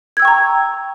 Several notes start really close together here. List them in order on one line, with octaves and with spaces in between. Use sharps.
G#6 E6 G5 C#6 A#5